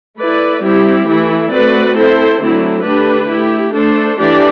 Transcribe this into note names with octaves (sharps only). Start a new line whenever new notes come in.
A3 E4 B4 D5
G3 C4 E4 G4
E3 A3 E4
A3 C4 F#4 B4 D5
C4 E4 A4 C5
D3 F#3 A3 C4 E4
D3 A3 D4 G4 B4
A3 E4 G4
A3 D4 A4 C5
E3 A3 D4 G4 D5